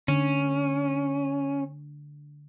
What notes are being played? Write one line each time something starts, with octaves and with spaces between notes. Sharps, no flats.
D3 C#4